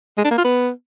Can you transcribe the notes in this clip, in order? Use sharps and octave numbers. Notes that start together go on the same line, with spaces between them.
G#3
D4
A#3
F4
B3